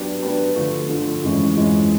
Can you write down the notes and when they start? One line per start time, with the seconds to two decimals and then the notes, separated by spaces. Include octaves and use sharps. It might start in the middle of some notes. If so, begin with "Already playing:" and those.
Already playing: F#3 B3 D4 G4
0.22 F#3 B3 D4 G4
0.55 D3 F3 A3
0.89 D3 F3 A3
1.23 F2 C#3 E3 G#3 C#4
1.56 F2 C#3 E3 G#3 C#4